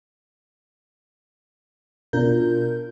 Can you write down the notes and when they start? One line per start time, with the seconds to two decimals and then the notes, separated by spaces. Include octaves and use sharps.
2.13 B2 D4 F4 A#4 G6